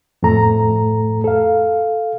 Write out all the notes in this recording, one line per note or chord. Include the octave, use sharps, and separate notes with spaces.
F2 A2 A3 A4 A#5
A4 F5